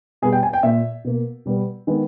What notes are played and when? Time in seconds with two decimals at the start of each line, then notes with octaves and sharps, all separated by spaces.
0.22 B2 G3 B3 G#4
0.33 G5
0.43 G#5
0.53 G5
0.63 A#2 A#3 E5
1.04 B2 A#3
1.45 B2 G3 B3
1.87 D#3 G#3 B3